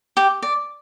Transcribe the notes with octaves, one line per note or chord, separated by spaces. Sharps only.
G4
D5